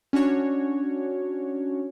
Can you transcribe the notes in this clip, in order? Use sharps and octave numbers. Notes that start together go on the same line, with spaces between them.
C#4 D4 F#4 C#5